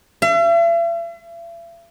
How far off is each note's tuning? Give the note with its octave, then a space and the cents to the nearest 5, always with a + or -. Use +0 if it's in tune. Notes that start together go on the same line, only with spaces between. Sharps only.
E5 +45